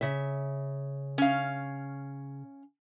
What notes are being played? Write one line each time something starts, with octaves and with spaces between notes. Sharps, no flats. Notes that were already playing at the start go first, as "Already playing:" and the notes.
C#3 E5
C#4 F5